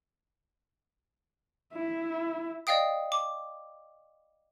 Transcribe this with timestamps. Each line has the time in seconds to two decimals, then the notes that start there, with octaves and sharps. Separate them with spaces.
1.74 E4
2.67 D5 D#5 F5 G5 D#6
3.12 D6